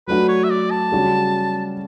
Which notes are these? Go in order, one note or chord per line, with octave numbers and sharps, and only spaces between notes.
F#3 A3 D4 F#4 B4
C#5
E5
D5
A5
C#3 G3 C#4 F#4